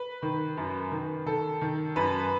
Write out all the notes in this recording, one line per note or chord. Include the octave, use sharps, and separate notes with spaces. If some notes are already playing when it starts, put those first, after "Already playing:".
Already playing: B4
D#3
F#2
D#3
D#3 A4
D#3
F#2 B4